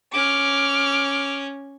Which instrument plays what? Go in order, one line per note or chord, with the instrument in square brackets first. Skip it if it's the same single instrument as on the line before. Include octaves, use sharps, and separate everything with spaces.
[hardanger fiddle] C#4 [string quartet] D6 F6